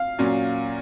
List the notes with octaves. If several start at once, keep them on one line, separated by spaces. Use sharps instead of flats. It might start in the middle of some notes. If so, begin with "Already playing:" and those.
Already playing: F5
A#2 F#3 C#4